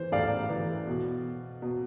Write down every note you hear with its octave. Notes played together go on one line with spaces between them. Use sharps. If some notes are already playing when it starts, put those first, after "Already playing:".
Already playing: E3 C5
A2 D5 F5
E3
B2
B2